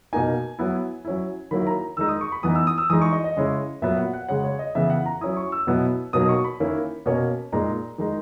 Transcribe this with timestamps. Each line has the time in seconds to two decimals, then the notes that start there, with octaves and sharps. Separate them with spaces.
0.13 B2 A#3 D#4 G#5
0.59 F#3 B3 E4
1.05 F#3 C#4 E4
1.51 D#3 F#3 A#3 E4 B5
1.67 A#5
1.97 D#3 G#3 D#4 E6
2.08 D#6
2.21 C#6
2.32 B5
2.43 E3 B3 D#4 D#6
2.55 E6
2.67 D#6
2.78 E6
2.90 E3 G#3 D#4 D#6
3.02 C#6
3.13 D#5
3.24 D#5
3.37 C#3 G#3 C#4 E4
3.82 A#2 F#3 B3 E5
3.97 F#5
4.13 F#5
4.29 C#3 G#3 C#4 F#5
4.44 C#5
4.59 D#5
4.75 C#3 E3 B3 E5
4.90 F#5
5.06 A#5
5.21 F#3 C#4 E4 D#6
5.37 C#6
5.52 E6
5.67 B2 F#3 B3 E4
6.13 B2 F#3 A#3 D#4 D#6
6.29 C#6
6.44 B5
6.60 D#3 A#3 C#4 E4
7.06 B2 A#3 C#4
7.52 A#2 G#3 D#4 A#5
7.98 D#3 G#3 D#4